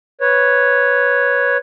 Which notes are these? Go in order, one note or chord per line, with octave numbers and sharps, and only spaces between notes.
B4 C#5